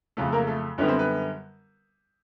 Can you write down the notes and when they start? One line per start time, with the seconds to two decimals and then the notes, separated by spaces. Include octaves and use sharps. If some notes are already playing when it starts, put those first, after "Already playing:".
0.17 F2 C#3 F#3 A3 A4
0.32 A#3 A#4
0.47 A3 A4
0.78 F#2 D3 G3 B3 C#4 C#5
0.88 C4 C5
0.98 B3 B4